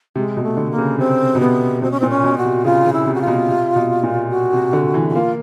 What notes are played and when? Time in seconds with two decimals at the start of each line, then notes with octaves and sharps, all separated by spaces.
0.15 C3 G#3
0.37 B2
0.43 A3
0.57 D3
0.71 A#3
0.78 C#3
0.98 C3 C4
1.35 B2
1.40 C3 B3
1.82 B2 C4
1.91 C#4
2.00 A#2 C4
2.10 C#4
2.24 B2
2.38 F#4
2.45 C3
2.65 C#3 F4
2.86 C#3
2.93 E4
3.06 C3
3.15 F#4
3.21 F4
3.27 B2
3.49 C3
3.76 B2
4.03 A#2
4.31 F#4
4.53 C3
4.73 D3
4.94 E3
5.10 F#4
5.14 A#3 F4